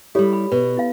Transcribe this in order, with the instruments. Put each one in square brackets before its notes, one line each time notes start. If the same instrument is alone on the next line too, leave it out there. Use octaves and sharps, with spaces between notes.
[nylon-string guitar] G3 E4 [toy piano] G4 A4 C#5
[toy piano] B5
[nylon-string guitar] B2 [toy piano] B4
[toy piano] E4 F5